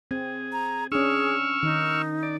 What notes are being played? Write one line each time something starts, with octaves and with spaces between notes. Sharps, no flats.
C4 G#4
A#5
C#4 D4 G#4 C#6 E6 F6
D#3 D#4
D5